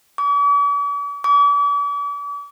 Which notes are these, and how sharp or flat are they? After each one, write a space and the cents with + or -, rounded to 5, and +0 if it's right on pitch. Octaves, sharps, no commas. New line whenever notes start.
D6 -45
D6 -40